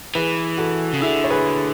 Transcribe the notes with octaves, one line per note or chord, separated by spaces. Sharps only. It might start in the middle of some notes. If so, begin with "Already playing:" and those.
E3 G#4 B4
F#4 A4
C#3
D3 E4 G#4
C#5
G#4 B4